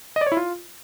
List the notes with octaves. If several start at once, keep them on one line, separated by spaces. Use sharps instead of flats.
D#5
D5
C#5
E4
F4